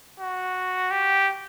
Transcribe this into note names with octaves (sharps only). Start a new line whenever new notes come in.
F#4
G4